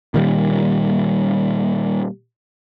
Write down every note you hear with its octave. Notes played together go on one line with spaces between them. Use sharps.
A#2 D#3 G3